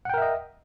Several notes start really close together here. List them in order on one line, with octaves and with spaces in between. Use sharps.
F#5 G5 A#4 E5 D#5